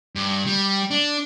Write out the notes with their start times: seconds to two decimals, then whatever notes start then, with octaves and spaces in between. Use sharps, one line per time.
0.15 G2
0.47 G3
0.91 D4